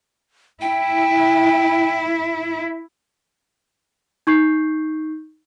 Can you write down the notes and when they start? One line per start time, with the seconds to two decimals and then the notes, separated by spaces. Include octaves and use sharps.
0.61 E4 G5
4.27 D#4 C#6 G6 C7